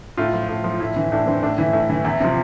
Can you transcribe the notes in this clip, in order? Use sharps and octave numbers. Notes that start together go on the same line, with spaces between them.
A2 F4
F3
A2
F3
A2 E4
E3
A2 D4
E3 C4
A2 D4
E3 E4
A2
E3
E2 E4
C3 F3